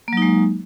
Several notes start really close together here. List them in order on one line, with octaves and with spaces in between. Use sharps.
A#3 F#3 D#4 G#3